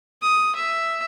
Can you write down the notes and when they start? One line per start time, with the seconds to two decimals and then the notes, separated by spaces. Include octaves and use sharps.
0.22 D#6
0.56 E5